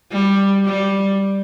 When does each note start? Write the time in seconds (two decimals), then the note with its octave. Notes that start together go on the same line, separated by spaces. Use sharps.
0.12 G3
0.65 G3